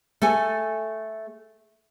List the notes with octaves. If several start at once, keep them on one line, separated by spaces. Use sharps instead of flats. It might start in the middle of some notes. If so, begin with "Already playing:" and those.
A3 A4 G#5